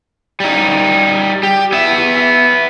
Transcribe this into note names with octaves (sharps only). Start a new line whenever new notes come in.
G3 D#4
G4
B3 E5